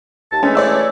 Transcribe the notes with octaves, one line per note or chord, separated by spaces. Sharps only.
D#2 A5
E3 G#3 A3 C#4
C#5 D5 E6